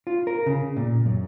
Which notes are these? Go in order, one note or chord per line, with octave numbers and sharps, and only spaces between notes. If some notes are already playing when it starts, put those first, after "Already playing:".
F4
A#4
C#3
A#2
F#2